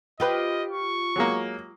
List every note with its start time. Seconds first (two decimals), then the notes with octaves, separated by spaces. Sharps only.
0.20 F4 G4 B4 D#5
0.71 C#6
1.16 F#3 G#3 A#3